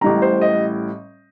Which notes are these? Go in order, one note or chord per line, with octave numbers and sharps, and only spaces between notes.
A1 A2 G3 A#5
C5
D#5